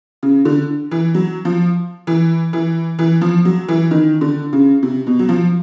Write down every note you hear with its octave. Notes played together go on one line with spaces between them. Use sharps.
C#3
D3
E3
F#3
F3
E3
E3
E3
F3
F#3
E3
D#3
D3
C#3
C3
B2
F#3
F3